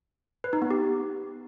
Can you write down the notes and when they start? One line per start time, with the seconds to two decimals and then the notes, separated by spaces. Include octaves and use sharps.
0.44 B4
0.53 D#4
0.62 B3
0.71 G4